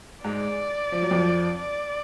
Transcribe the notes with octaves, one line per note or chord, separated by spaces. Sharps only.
G#2 G#3 D5
F3
F#3
F2 F3
D5